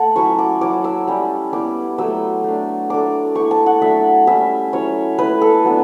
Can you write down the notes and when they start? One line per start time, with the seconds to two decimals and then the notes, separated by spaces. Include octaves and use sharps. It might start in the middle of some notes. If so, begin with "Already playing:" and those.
Already playing: A3 F#5 A5
0.16 F#3 C#4 E4 C#6
0.39 D6
0.61 F#3 C#4 E4 D6
0.84 E6
1.07 G3 C#4 E4
1.52 G3 B3 E4 D6
1.98 F#3 A3 E4 E6
2.44 A3 D4
2.90 A3 D4 D6
3.35 A3 E4 C#6
3.51 A5
3.66 F#5
3.81 F#3 A3 D4 E5
4.27 G3 C#4 E4 E5
4.73 F#3 C#4 E4 C#5
5.18 A3 E4 B4
5.41 A4
5.65 F#3 B3 D4